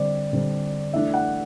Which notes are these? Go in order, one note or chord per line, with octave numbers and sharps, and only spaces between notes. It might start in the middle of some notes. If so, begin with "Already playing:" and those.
Already playing: D3 G3 C4 D5
D3 G3 C4
E3 A3 D4 E5
F#5